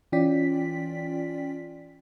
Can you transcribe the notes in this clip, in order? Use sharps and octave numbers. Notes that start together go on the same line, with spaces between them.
E3 C#4 F4 D5 G5 B6